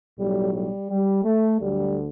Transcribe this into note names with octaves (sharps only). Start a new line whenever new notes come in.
B1 A2 F#3 G3
G3
G3
A3
D2 D3 F#3 G3